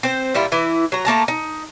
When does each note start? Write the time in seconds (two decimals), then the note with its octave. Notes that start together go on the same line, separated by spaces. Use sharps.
0.03 C4 C5
0.34 A#2 G3 E4 F4
0.52 E3 E4
0.92 F#3 A#5
1.05 A3 A#3 A5 A#5
1.28 D#4